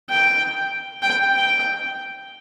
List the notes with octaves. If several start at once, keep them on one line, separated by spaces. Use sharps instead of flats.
G5
G5
G5